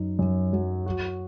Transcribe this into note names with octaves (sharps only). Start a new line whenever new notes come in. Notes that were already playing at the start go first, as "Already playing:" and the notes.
Already playing: F#2 D#4
F#2
F#3
F#4